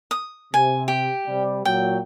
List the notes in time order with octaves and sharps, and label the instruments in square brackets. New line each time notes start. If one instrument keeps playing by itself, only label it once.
[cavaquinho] D#6
[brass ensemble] C3 [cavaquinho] G#5
[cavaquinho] G4
[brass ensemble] C3 G3
[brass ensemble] A#2 F#3 [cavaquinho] G5